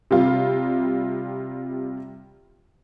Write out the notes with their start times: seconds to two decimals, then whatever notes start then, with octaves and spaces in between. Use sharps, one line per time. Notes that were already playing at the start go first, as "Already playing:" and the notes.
0.11 C3 G3 F4